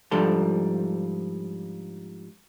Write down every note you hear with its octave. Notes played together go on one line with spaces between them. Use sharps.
G#2 F3 G3 D4 A4 C6